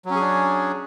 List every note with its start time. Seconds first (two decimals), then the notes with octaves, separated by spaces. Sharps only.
0.06 F#3
0.11 C#4
0.16 G#4
0.21 D4